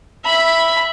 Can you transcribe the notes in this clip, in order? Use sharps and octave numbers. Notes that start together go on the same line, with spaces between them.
E5 B5